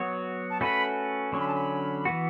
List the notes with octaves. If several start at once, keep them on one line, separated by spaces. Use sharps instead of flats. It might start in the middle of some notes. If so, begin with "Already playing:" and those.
Already playing: F#3 B3 F#4 C#5
A5
A3 C#4 F#4 B4 B5
D3 F#3 C#4 C#6
B5
A5
B5
E3 B3 F#4